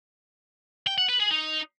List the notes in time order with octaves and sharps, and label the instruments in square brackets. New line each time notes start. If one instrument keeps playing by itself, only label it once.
[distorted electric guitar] G5
F#5
B4
G#4
D#4